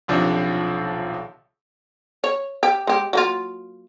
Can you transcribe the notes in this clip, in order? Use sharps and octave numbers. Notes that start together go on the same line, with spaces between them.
D#1 B1 C3 F3 D4
C#5
G4
G#3 G4
F#3 A#3 F4